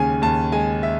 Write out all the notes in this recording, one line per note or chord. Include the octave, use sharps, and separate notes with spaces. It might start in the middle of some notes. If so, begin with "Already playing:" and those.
Already playing: D#2 C#3 G#3 G#5
D#2 A5
G#3 G#5
E5